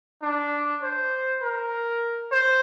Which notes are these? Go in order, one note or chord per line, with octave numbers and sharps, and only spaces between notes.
D4
C5
A#4
C5